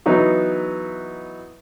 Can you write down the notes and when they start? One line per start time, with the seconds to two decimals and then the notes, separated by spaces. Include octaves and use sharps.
0.06 E3 F#3 B3 D#4 E4 F#4